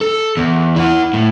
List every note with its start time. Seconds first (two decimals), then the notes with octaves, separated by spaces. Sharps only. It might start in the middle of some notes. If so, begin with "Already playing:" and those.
0.01 A4
0.37 E2
0.76 E4 F#5
1.13 A2